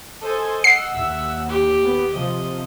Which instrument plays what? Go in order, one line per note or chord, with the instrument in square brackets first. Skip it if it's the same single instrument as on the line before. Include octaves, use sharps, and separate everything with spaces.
[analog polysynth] A4 C5 G#5 [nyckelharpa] D#5
[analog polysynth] F#5 E6 [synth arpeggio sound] C7
[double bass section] D#2 [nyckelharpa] E5
[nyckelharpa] G4
[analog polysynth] B3
[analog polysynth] C3 F3 [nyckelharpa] D#5